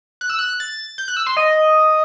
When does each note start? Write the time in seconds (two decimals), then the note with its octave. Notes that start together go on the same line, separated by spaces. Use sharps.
0.21 F#6
0.30 E6
0.39 F#6
0.60 A6
0.98 G6
1.08 F#6
1.17 E6
1.26 C6
1.37 D#5